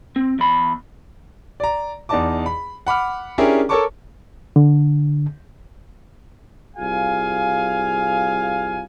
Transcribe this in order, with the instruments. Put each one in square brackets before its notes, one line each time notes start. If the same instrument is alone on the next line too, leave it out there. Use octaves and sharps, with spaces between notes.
[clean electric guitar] C4
E2 B5
[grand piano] D5 A#5
E2 D#4 D5 D#5 A5 D6
B5
F#5 B5 D6 F6
C#4 D4 E4 G4 G#4 A#4
A4 A#4 C#5 A5 C#6 D6
[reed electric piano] D3
[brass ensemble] C2 F4 G#4 F5 G#5